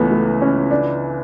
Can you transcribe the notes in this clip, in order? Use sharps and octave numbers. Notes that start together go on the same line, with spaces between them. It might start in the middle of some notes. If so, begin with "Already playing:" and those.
Already playing: C#2 E3 A3 B3 C#4
A3
C#4
D4